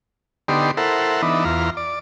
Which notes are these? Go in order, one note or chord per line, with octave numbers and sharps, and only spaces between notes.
D3 B3 D#4 G4 C6
E4 A4 A#4 C5 F#5
E3 B3 D4 D#4
E2 F4 A#5
D5